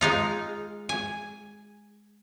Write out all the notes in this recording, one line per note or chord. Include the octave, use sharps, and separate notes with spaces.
G#3 D#4 F4
G#5